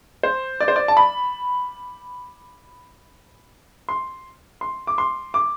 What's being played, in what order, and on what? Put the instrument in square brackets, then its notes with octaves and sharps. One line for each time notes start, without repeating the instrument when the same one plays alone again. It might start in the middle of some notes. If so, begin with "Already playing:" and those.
[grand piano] C5
D5
C5
D5
A5
B5
C6
C6
D6
C6
D6